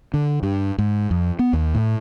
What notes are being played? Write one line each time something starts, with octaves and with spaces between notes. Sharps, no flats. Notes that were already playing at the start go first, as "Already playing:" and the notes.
D3
G2
G#2
F2
B3
D#2
A2